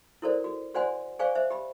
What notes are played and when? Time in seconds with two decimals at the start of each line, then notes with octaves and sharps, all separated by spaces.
0.22 E4 F#4 A4 A#4 C5 D5
0.44 F#4
0.74 F#4 C5 D5 F#5 G#5 C6
1.19 G#4 C5 D5 F5 G#5 C#6
1.35 C5 E5
1.50 G4 B5